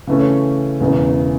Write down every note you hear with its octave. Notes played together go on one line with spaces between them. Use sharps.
C#3 E3 A3 C#4
E1 E2 C#3 E3